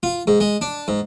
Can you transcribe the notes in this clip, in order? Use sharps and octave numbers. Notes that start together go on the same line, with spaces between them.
F4
G#2
G#3
D4
G#2